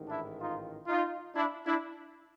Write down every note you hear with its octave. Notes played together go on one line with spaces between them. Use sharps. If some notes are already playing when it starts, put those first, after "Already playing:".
Already playing: A1 G#2 D#3
D4 E4
D#4 F4
D#4 F4
D4 E4
D4 E4